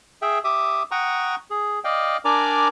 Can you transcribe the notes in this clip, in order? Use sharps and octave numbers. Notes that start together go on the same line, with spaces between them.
G#4 E5 G5
G4 E5 D6 D#6
F#5 G5 A#5 C#6 D#6
G#4
D5 D#5 F5 G5
D4 A#4 D5 G#5 A#5 D6